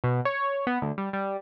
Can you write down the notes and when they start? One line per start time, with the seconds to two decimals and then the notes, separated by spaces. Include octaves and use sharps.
0.04 B2
0.25 C#5
0.67 B3
0.82 D2
0.98 G3
1.13 G3